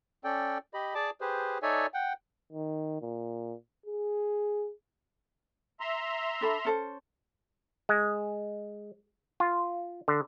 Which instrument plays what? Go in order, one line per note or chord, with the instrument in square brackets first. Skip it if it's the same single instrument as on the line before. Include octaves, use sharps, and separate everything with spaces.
[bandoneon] C#4 A4 D5 G5
G4 D#5 B5
G#4 D5 A5 D6
G4 G#4 B4 C5
D#4 A4 C#5 D5 E5 G#5
F#5 G5
[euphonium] D#3
A#2
G#4
[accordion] E5 A#5 C6
[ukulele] D4 A4 B5
C#4 A4 C5
[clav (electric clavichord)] G#3
F4
D3